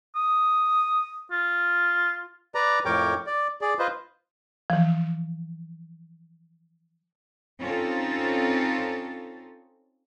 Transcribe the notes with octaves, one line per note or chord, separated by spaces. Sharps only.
D#6
F4
B4 D5 A#5
F2 A2 A#4 C#5 G5 D6
D5
G#4 D5
F4 B4 C5 D#5
E3 F3
C4 C#4 D#4 F4 A4